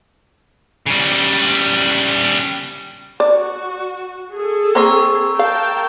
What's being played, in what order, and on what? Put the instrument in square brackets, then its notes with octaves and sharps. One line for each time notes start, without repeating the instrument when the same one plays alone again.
[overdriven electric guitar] C#3 G3
[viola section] F#4 [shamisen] D5
[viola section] G#4 A4
[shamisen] A#3 C4 [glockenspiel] A#5 C#6 E6
[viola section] A#4 G5 A5 [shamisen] F5